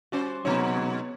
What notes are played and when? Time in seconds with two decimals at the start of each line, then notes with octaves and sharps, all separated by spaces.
0.12 G3 C#4 F#4 C5
0.45 B2 F#3 G#3 B3 D#4 C#5